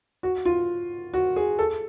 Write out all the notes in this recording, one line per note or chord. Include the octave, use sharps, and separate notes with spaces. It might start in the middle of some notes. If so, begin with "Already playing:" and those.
F#4
F4
F#4
G#4
A4